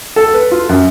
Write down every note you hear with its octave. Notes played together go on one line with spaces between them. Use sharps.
A4
B4
F4
F#2